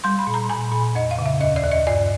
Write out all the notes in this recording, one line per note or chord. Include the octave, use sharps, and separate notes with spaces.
G3 C6
B5
A#2
A#5
A#2 G#5
A#2
F2 D#5
F5
C#3
E5
D#2 D#5
D5
D#2
D#5
G2 D5